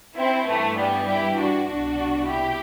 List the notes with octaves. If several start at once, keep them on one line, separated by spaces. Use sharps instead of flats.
C4 E4
G2 E3 A3
G3 B3
E4 G4
D4 F#4
C2 B2 D4 F#4
E4 G4